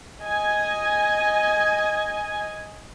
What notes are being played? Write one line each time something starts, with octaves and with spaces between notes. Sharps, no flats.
D#5 G#5